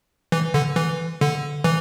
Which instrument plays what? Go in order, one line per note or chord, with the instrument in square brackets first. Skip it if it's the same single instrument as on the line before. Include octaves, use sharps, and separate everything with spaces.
[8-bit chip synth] E3
D3
E3
D3
E3